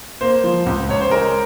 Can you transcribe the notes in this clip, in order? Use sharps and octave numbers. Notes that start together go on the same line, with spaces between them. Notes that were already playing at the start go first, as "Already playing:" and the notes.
A#3 C5
F3
C#2
C#2 C#5
C5
G#3 A#4